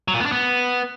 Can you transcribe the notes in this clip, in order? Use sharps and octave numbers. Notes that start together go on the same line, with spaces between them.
F#3
A#2
B3
D4
B3